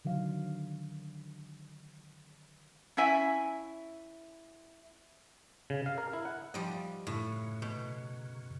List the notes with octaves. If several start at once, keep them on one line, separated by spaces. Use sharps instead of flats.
D3 D#3 F#3 F5
C#4 E4 E5 G#5
C#3
F5
A#4
E4
F#5
F3 G3 D#5
F#2 A2 C#3
B2